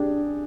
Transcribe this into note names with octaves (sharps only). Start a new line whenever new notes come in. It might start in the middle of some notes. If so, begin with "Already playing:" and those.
Already playing: D4 G4 G#4